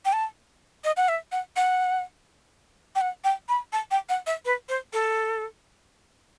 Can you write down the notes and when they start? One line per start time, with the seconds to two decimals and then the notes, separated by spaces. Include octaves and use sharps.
0.05 G5
0.13 A5
0.84 D#5
0.97 F#5
1.08 E5
1.32 F#5
1.56 F#5
2.95 G5
3.01 F#5
3.24 G5
3.49 B5
3.73 A5
3.91 G5
4.09 F#5
4.27 E5
4.45 B4
4.69 C5
4.93 A4